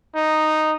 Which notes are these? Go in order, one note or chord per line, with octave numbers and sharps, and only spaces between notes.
D#4